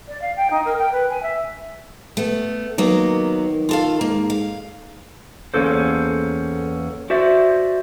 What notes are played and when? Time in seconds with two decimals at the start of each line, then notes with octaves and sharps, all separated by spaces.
0.08 D5
0.21 F5
0.36 G5
0.50 D#4
0.65 A#4
0.78 G5
0.92 B4
1.09 G#5
1.22 E5
2.17 A3 B3
2.78 D#3 F#3 A#3 B3
3.69 F4 A4 F5
4.01 G#2 A#3
4.30 F5
5.54 E2 D#3 A#3 C#4 A4 C5
7.10 F#4 C5 D5 E5